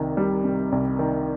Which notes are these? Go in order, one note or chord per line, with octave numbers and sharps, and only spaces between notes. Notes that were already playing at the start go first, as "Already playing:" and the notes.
Already playing: C2 C3 D#3
G3
C3
C2
D#3